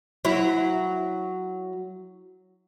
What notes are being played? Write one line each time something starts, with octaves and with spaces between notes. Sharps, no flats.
F#3 E4